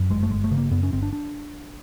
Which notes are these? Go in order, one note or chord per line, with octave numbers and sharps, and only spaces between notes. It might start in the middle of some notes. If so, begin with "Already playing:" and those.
Already playing: F#2
G1 G#3
A3
G1 G#3
A3
C#3
A#3
F#2 B3
C#4
G1 C4
D4
D4